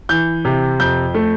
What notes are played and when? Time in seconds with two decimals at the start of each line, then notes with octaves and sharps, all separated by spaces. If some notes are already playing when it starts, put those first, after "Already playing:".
0.09 E3 G6
0.45 C3
0.80 F2 G6
1.14 A3